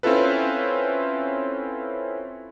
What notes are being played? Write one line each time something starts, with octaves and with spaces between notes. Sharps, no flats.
C4 C#4 E4 F4 A4 B4